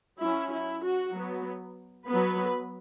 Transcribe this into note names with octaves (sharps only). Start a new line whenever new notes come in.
F#3 C#4 E4
E4
F#4
F#3 B3
F#3 B3 B4